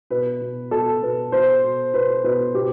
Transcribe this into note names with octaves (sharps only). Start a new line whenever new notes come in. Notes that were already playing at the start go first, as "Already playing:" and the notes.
B2 B4
B2
B2 A4
B2 B4
B2 C5
B2
B2 B4
B2 B4
B2 G4